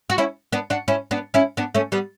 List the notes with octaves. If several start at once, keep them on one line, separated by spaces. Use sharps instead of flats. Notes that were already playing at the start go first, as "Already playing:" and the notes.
F#4
C#4 E4
B3 D4
D4 F#4
C#4 E4
B3 D4
C#4 E4
B3 D4
A3 C#4
G3 B3